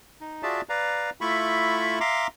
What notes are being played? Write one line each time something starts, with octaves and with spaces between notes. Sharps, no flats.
D#4
F4 F#4 G#4 D5 E5 A5
B4 D5 F5 A#5
A3 E4 F4 E5 B5 C#6
E5 F5 A#5 C6 D6